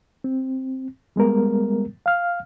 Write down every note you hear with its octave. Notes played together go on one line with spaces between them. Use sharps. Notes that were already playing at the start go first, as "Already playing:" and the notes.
C4
G3 G#3 B3 A#4
F5 F6